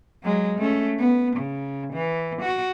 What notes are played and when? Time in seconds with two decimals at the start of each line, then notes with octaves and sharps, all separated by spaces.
0.23 F#3 G#3
0.59 A3 C#4
0.99 B3
1.36 C#3
1.93 E3
2.42 F#4